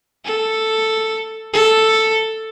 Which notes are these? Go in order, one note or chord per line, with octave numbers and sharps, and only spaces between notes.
A4
A4